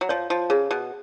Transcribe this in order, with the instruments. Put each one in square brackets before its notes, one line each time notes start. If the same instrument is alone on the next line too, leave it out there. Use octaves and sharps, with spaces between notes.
[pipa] F#3
[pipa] F3 [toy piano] C#5
[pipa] F3
[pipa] C#3 [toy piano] G#4
[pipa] B2